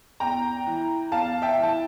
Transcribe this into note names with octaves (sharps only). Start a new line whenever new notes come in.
E2 G5 A#5
E3
E2 F5 A5
E5 G5
E3
A5